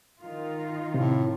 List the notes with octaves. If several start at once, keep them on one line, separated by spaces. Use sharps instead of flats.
D#3 D#4 F4
A2 C3